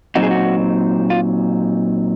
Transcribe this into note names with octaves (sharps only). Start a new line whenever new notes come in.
A#2 F#3 C4 D#4 F#4
G#4
F#4
F4